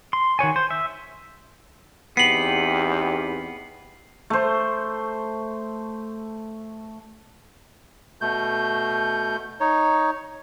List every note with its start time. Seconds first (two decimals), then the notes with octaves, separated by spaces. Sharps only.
0.13 C6
0.39 D#3 F#4 C#5 G#5
0.56 C5
0.71 E5
2.17 E2 B3 C4 D#4 G4 C7 F#7
4.30 A3 C5
8.21 B2 A3 G6
9.60 D#4 C#5